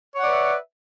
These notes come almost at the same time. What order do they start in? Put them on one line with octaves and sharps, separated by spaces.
C#5 F#5 D5 B4 E5